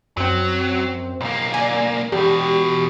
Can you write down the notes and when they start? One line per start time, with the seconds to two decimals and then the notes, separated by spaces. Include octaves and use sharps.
0.17 F#2 F#3 C4
1.21 B1 A#3
1.54 D5 G#5
2.12 E2 B2 G4